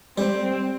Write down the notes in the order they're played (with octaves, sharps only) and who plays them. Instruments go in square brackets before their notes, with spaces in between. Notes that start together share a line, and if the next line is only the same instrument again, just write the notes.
[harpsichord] G3 [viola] C4